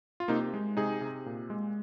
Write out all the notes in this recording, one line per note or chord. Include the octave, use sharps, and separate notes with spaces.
F4
C3 A#3 D#4
G#3
C3 D#4 G#4
C3
A#2
G#3